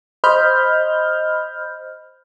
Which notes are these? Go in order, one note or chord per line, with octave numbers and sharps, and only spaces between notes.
C5 D#5 B5 F6 G6